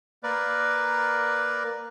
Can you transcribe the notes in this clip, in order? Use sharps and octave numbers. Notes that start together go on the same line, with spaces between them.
A#3 A#4 B4 D5